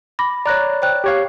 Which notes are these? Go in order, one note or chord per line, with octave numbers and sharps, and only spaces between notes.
B5 D6 A#6
C#5 D5 A#5 F#6 A#6
C5 G5 F#6
G4 C#5 F5